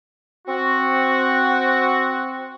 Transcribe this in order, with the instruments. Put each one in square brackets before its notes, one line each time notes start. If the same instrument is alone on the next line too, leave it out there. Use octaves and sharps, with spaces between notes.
[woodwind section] C4 F#4